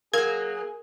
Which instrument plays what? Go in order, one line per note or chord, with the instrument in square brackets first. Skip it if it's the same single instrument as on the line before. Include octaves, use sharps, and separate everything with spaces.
[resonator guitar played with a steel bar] F#3 A#3 [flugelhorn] G#4 [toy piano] A#4 [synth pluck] G#6